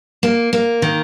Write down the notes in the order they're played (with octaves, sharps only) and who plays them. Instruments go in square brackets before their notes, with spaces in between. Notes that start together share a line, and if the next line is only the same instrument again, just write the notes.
[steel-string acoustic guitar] A#3
A#3
D#3